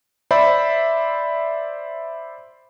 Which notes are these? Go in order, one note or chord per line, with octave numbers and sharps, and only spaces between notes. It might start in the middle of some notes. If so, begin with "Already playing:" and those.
C5 D5 E5 B5